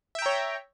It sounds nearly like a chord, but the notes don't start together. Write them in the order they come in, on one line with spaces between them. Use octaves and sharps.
E5 G5 A#5 C#5